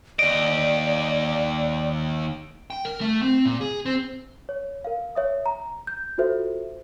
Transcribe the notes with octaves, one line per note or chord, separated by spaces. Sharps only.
D#2 D5 D#5 D7
G5
A#4
A3
C4
A#2
G#4
C4
C#5
A#4 F5
C#5 E5 D#6
A#5
G6
F4 F#4 A4 C5 E5